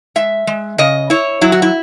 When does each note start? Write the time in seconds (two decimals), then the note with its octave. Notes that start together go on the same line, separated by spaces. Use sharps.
0.16 G#3 E5
0.47 G#3
0.78 C#3 D#5
1.10 E4 C#5
1.41 F#3 E4
1.52 F#4
1.62 E4